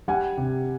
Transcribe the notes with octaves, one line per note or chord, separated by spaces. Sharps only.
G3 F#5 G#5
C3